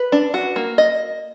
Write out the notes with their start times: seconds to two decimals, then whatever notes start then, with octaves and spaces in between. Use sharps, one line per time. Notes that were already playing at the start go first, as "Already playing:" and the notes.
Already playing: B4
0.12 D4
0.34 F#4
0.56 A#3
0.78 D#5